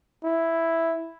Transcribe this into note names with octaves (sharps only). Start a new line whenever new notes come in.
E4